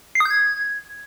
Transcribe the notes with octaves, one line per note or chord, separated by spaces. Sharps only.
C7
D#6
G6
G#6